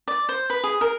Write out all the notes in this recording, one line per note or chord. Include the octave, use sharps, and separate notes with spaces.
D5
C5
B4
G#4
A#4